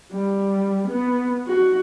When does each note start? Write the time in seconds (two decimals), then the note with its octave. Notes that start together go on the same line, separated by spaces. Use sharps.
0.12 G3
0.87 B3
1.47 F#4